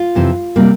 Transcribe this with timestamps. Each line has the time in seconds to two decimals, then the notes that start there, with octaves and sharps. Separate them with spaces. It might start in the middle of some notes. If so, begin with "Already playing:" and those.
Already playing: F4
0.15 F2 C3 E3
0.56 C3 G3 A#3